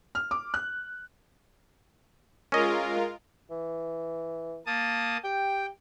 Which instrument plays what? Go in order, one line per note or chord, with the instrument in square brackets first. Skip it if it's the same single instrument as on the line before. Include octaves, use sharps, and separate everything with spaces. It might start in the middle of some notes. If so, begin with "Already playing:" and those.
[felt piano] F6
D6
F#6
[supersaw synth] G#3 F4 A#4 [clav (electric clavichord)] C#4 D#5
[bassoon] E3
[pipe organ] A#3 A5 D#6
[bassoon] G4 [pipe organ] G5